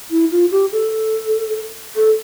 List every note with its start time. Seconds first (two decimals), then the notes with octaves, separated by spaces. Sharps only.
0.11 E4
0.31 F4
0.51 G4
0.72 A4
1.96 A4